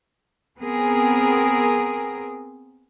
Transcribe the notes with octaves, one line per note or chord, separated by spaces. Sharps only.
B3 C4 G#4 A#4